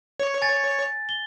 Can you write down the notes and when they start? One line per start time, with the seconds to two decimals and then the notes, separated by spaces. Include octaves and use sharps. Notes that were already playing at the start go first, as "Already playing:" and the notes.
0.20 C#5
0.42 G#5 A6
1.09 G7